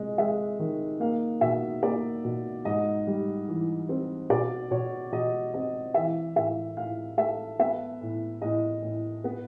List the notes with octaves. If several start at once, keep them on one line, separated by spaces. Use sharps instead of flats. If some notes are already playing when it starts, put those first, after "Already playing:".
Already playing: C3 G#3 D#5
G#3 E5
D#3
A#3 F5
B2 E5
A#3 D5
B2
G#2 D#5
G3
E3
C4
B2 D5
B2 C#5
B2 D#5
C4 D#5
E3 E5
A2 E5
A2 F5
A3 E5
B3 E5
A2
A2 D#5
A2
B3 B4